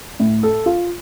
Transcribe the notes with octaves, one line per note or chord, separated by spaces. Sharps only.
A2
A4
F4